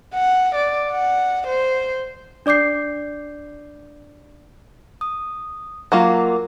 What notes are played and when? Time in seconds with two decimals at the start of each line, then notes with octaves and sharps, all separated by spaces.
0.14 F#5
0.55 D5
0.90 F#5
1.47 C5
2.46 D4 D5 D6 G6 C7
5.01 D#6
5.92 F#3 A#3 F4 F#4 A#4 D6